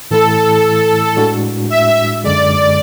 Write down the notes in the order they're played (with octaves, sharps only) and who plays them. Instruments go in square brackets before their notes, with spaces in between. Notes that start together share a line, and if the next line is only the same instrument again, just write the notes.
[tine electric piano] A2 E3 A3 E4 [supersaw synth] A4
[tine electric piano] A2 G#3 D4 F#4
[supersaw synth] E5
[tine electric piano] F#2 D3 G#3 [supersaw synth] D5